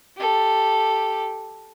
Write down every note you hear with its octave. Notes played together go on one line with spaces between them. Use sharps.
G4 A4